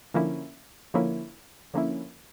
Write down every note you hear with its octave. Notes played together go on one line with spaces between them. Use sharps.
D3 F3 A#3 C#4 E4
D3 F3 A#3 C#4 E4
D3 F3 A#3 C#4 E4